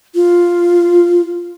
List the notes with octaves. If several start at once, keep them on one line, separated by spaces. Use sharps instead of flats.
F4